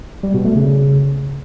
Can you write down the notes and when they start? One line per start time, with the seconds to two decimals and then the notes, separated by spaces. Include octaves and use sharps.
0.23 G3
0.34 B2
0.45 A3
0.56 C#3